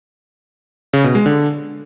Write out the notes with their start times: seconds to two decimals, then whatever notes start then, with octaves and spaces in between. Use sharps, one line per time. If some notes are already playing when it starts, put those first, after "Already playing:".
0.93 C#3
1.04 B2
1.15 G#3
1.26 D3